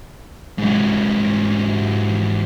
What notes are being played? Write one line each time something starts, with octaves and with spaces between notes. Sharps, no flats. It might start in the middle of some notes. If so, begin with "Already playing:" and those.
G#2 F#3